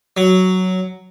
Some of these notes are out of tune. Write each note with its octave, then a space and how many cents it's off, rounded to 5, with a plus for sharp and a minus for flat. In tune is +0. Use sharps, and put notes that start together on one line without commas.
F#3 +5